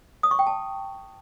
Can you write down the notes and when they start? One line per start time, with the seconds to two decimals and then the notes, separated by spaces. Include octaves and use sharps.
0.23 D#6
0.31 C#6
0.39 G5
0.47 A5